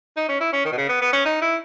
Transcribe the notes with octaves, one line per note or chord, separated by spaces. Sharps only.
D#4
C#4
E4
C#4
D#3
B2
C#3
B3
B3
C#4
D#4
E4